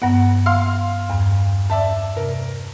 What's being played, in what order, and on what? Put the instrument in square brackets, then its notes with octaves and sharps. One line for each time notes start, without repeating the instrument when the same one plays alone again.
[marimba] G2 B3 [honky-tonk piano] F#5
[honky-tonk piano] F5 C6 F6
[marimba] E2 G2
[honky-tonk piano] D5 E5 A5
[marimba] C3 [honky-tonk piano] A#4